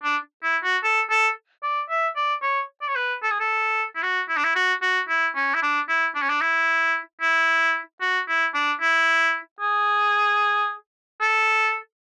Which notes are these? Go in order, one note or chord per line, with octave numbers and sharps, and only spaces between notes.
D4
E4
F#4
A4
A4
D5
E5
D5
C#5
D5
C#5
B4
A4
G#4
A4
E4
F#4
E4
D4
E4
F#4
F#4
E4
C#4
E4
D4
E4
D4
C#4
D4
E4
E4
F#4
E4
D4
E4
G#4
A4